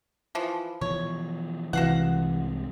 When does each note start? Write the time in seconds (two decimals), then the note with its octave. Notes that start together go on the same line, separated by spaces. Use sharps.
0.35 E3 F3
0.81 B2 E3 F3 C#5
1.73 C2 G#2 C3 E3 F#4 F5 F#5